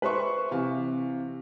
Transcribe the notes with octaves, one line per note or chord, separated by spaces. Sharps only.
B4 C5 E5 C6 C#6
C3 E3 F5